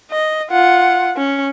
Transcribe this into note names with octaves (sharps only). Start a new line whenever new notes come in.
D#5
F4 F#5
C#4